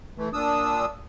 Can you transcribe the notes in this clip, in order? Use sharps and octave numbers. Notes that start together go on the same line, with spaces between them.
E3 A3
A#2 D4 D#6 E6